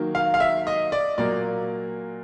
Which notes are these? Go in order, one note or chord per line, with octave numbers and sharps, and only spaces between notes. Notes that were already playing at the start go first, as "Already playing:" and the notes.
Already playing: D#3 F#3 A#3
F5
F5
E5
D#5
D5
A#2 F#3 A#3 D5